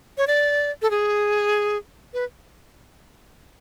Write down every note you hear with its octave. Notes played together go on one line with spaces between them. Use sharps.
C#5
D5
A4
G#4
B4